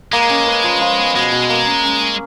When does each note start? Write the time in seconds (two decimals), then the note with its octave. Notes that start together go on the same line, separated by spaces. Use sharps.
0.12 G#3 A#3
0.30 C#4
0.47 B4
0.64 F3
0.81 F3
0.99 B3
1.15 B2 G#3
1.32 B2
1.49 A#3
1.66 C#4
1.83 C#4
2.01 C#4